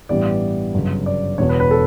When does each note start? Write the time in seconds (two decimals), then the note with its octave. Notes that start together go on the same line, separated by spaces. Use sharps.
0.09 A1 G2 E3 G3 B3 D5
0.74 G1 F#2 C#3
1.06 D5
1.38 E1 E2 B2 C#5
1.49 B4
1.60 B4
1.71 A4